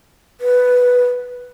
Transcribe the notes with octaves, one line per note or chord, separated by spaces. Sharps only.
B4